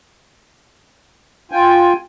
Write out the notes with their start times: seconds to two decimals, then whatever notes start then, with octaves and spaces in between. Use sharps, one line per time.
1.52 F4 G5 G#5